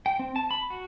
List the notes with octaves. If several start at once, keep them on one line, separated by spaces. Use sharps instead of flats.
G5
C4
A5
B5
F#4